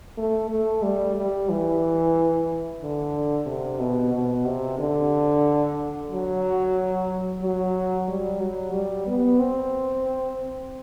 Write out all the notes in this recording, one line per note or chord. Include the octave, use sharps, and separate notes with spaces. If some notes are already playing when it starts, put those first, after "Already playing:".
A3
A3
G3
G3
E3
D3
C3
B2
B2
C3
D3
F#3
F#3
G3
F#3
G3
B3
C4